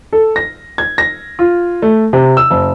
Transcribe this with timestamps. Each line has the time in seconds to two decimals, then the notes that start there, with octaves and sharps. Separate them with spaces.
0.13 A4
0.36 A#6
0.78 G#6
0.98 A#6
1.39 F4
1.82 A3
2.13 C3
2.37 E6
2.50 F#1